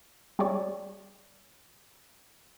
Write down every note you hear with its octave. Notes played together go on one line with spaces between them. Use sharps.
G3 G#4 C#5 D5